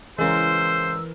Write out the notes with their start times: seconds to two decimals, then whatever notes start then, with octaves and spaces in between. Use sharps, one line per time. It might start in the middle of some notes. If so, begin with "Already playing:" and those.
0.19 C#3 E3 G#3 A#4 C5 E6